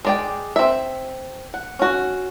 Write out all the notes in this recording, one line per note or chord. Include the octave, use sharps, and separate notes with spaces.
G#3 D5 G5
C4 E5
F#5
C#4 F#4